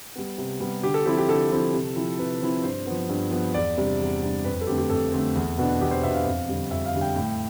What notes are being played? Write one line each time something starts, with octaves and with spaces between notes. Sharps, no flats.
G3 B3
C3
G3 B3
D3 G4
A4
F3 C4 E4 G4
G4
D3 A4
F3 C4 E4
C3
F3 C4 E4
C3 B4
F3 C4 E4
G2 C5
F3 B3
G2
F3 B3
E2 D5
C3 G3 D4
E2
C3 G3 D4
F2 B4
A4
D3 A3 C4 G4
G4
F2 A4
D3 A3 C4
E2
B2 B3 D4
E2 G4
C5
B2 B3 D4 E5
F5
F2
D3 G3
F2 E5
F5
D3 G3
G5
A2